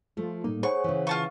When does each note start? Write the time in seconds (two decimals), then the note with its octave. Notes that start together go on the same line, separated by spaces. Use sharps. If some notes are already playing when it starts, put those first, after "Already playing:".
0.17 F3 A3 F4
0.44 A2 G3 A#3 D#4
0.63 G#4 C5 C#5 F#5 G#5 C#6
0.84 C#3 E3
1.07 F4 F5 A5 C#6